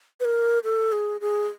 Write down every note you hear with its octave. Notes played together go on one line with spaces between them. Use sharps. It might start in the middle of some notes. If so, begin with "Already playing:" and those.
B4
A#4
A4
G#4
G#4